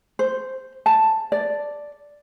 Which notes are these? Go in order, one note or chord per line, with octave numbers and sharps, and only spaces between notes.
C5
A5
D5